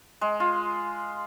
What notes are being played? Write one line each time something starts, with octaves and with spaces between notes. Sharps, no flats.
G#3
F4